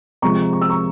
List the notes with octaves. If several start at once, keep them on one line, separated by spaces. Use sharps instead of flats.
C3 F3 G#3 A#5 C#6
C#6
E6
A#5 C#6